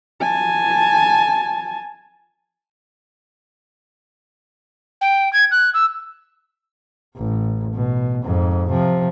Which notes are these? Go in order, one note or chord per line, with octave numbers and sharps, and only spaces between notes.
G#5 A5
G5
G#6
F#6
E6
A1
B2
F2 G#2
C3 F3